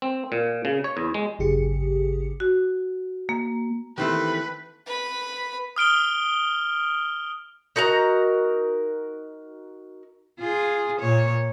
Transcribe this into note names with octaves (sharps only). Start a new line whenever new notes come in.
C4
A#2
C#3
C#5
E2
G#3
G#1 F#2 C#3 G4 G#4 C#7
F#4
A#3
D#3 E3 A3 A#3 C4 G4 B4
B4 B5
D#6 F6 D7 G7
D#4 F#4 A#4 A#5
F4 G#4
A#2 C#5